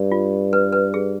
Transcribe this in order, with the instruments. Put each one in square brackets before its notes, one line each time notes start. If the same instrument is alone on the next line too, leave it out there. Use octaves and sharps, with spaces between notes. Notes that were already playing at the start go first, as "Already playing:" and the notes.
Already playing: [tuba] G2
[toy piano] F4
B4
B4
G#4